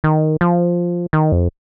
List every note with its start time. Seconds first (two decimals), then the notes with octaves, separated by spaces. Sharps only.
0.04 D#3
0.41 F3
1.13 D#3
1.32 F2